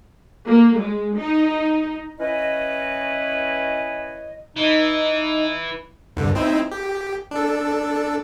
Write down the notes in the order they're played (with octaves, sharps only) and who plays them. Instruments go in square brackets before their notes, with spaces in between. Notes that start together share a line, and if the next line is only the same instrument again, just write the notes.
[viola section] A#3
G#3
D#4
[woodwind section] E3 C#4 E4 B4 C#5 D#5
[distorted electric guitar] E3 [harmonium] D#4
[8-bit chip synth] C2 G2 D3
C4 D#4 E4
G4
D4 A4